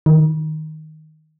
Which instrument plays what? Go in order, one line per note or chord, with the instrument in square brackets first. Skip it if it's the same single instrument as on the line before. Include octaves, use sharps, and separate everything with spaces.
[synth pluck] D#3